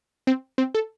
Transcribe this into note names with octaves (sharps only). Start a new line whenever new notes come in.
C4
C4
A4